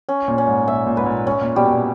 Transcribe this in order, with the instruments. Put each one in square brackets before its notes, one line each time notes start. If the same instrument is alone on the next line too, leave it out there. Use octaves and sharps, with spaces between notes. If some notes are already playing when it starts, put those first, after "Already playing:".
[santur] C#4
[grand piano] A#2
[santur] C#4
[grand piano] G#2
[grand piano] A#2 [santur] E5
[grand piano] A#2
[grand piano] G#2 [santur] B4
[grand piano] A#2
[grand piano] G#2 [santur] C#4
[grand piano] A#2
[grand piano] B2 [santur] G3
[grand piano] A#2